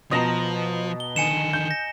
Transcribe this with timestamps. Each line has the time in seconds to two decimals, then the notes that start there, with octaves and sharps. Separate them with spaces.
0.11 B2 F3 D#5 A5 A#5 A#6
1.00 G7
1.16 D3 D#3 G#5 C#7 E7
1.53 G6
1.71 A#6